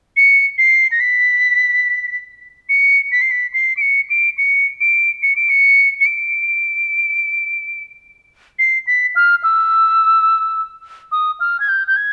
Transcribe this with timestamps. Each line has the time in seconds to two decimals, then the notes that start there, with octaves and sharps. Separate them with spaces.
0.17 C#7
0.58 C7
0.91 A#6
1.00 B6
2.69 C#7
3.12 B6
3.22 C7
3.31 B6
3.54 C7
3.77 D7
3.81 C#7
4.10 D7
4.38 C#7
4.80 D7
5.22 C#7
5.36 D7
5.49 C#7
6.01 C#7
6.06 D7
8.59 C7
8.87 B6
9.16 F6
9.43 E6
11.12 D#6
11.40 F6
11.60 G#6
11.68 G6
11.87 G6
11.96 G#6